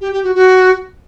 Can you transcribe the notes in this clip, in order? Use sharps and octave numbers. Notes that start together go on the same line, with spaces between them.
G4
G4
F#4
F#4